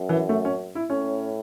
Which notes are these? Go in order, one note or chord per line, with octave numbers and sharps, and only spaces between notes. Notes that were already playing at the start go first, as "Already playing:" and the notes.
Already playing: F#2
E3
A3
C#4
E4
A2 C#4